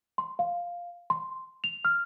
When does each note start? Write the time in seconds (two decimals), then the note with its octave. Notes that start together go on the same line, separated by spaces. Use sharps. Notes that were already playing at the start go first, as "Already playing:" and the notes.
0.18 C6
0.39 F5
1.10 C6
1.64 F7
1.85 F6